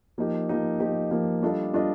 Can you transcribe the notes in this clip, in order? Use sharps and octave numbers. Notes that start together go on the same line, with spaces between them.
F3 A#3 D#4 G4
F3 A#3 D#4 G4
F3 A#3 D#4 G4
F3 A#3 D#4 G4
G3 D4 F4 A4 D#5
G3 D4 F4 A4 D#5